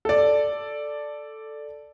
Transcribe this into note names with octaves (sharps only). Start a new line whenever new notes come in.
A4 D5